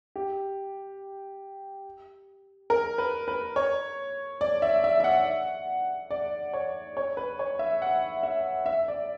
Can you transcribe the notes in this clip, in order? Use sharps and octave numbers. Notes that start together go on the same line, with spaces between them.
G4
A#4
B4
B4
C#5
D5
E5
E5
E5
F#5
D5
C#5
C#5
B4
C#5
E5
F#5
E5
E5
D5